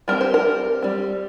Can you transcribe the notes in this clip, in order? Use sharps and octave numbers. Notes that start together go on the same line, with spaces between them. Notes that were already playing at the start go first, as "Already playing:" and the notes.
G3 C4 A#4
C5
A#4
G3 C4